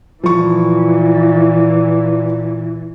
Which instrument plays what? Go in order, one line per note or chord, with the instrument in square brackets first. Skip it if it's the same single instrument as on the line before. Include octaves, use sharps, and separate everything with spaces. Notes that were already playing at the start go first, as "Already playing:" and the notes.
[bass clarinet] A#2 [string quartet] E3 [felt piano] F3 C#6